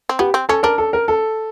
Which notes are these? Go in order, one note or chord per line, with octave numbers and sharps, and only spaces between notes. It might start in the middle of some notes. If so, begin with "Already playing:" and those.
C4
B3 G4
C4
C#4 A4
D4 A#4
A4
A#4
A4